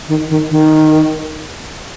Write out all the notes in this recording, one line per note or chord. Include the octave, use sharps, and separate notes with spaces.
D#3
D#3
D#3